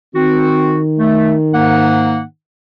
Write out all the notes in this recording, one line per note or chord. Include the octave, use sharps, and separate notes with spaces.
D#3 C4 F#4
A3
G#2 A#3 F#5